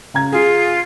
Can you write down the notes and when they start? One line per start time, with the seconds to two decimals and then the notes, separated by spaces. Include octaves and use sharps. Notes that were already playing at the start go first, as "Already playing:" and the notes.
0.14 C#3 A#5 G#6
0.32 F4 G#4